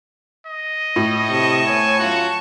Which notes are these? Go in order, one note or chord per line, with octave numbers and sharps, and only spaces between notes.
D#5
A2
C3 A5 C#6
A3 B3 C#5 G#5
F#3 C#4 F4 F#4